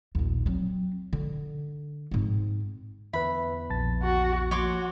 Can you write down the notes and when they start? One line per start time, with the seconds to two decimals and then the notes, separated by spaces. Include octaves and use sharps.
0.15 A#1 D#2
0.46 F#3 C4
1.13 D3
2.11 G#2 C4
3.13 E2 D3 B4 E5 B5
3.70 A#1 A5 A6
4.03 F#4
4.51 F3 A#3 F#4 C#5 C6 D6